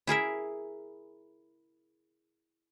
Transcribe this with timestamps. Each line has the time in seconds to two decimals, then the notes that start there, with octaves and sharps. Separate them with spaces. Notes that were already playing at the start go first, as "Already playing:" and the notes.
0.07 E4 G#4 A#4 E5